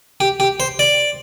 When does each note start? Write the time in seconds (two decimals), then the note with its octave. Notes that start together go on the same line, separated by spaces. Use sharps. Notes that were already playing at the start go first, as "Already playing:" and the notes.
0.20 G4
0.40 G4
0.60 C5
0.79 D5